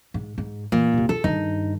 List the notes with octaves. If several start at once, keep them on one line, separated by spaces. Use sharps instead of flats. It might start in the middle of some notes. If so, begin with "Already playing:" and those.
G#2
G#2
A#2 E3
D#2 C3
F4 A4
G2 D#3 D#4